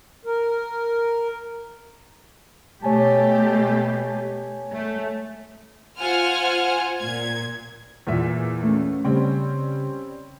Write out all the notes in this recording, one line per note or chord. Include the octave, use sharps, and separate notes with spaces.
A#4
B2 A3 G4 C#5 G#5 A5
A3
F4 C5 F#5 G#5 F6
A#2 G#6
E2 A#2 E5
A3 C#4
C#3 G3 C4 C#4